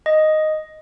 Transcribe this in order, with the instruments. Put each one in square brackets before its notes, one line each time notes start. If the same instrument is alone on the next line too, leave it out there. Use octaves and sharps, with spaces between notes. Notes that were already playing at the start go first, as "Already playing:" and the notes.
[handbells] D#5